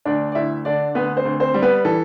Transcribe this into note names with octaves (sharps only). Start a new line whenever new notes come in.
D2 D4 D5
D5
D2 E4 E5
D3 D4 D5
D2 B3 B4
C4 C5
D2
C4 C5
G3
B3 B4
E3 A4